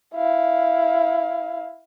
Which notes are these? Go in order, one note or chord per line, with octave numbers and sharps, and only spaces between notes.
E4 F5